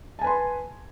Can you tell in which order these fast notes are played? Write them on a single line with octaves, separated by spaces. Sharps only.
A5 G#5 B4 C6